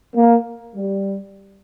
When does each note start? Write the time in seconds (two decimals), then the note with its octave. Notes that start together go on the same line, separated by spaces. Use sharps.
0.15 A#3
0.75 G3